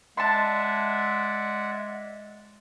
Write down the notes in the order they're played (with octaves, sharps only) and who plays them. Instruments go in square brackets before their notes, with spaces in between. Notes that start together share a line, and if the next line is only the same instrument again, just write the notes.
[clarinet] G#3 [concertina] D5 E5 F#5 [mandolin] A5 C6